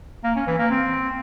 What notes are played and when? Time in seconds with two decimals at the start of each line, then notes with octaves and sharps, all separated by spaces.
0.24 A#3
0.35 C#4
0.47 E3
0.59 A#3
0.70 C4